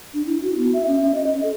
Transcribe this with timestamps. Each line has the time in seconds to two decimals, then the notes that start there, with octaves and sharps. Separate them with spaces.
0.14 D4
0.27 E4
0.42 F#4
0.58 B3
0.73 E5
0.88 C#4
1.01 C#4
1.15 D#5
1.27 C#4
1.43 A4